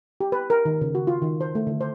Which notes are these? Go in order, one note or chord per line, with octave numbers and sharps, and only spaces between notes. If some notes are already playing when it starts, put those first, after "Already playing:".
G4
B4
A#4
D#3
C#3
F#4
F4
D#3
C5
A3
D3
C5